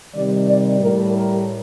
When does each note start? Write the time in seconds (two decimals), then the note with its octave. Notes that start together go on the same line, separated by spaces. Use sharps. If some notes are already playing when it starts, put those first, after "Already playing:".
0.15 C3 D#3 G3 D5
0.48 D5
0.81 A2 G3 A#4
1.15 A#4